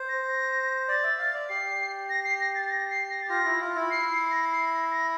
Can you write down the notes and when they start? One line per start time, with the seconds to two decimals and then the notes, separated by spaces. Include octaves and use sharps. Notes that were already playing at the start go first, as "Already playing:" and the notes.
Already playing: C5
0.09 A#6
0.28 A#6
0.88 D5 A6
1.03 E5
1.19 F5
1.34 D5
1.49 G4 C7
2.10 A#6
2.24 C7
2.40 A#6
2.55 A6
2.65 A6
2.70 A#6
2.90 C7
3.11 A#6
3.22 A6
3.29 F4 A#6
3.45 E4
3.61 F4
3.76 E4
3.91 C7
4.11 C7
4.31 A#6
4.51 C7
4.70 A#6
4.91 A#6